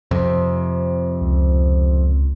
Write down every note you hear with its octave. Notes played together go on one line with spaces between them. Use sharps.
F2 C3
C#2